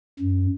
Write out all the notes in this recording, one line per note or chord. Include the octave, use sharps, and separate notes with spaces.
F#2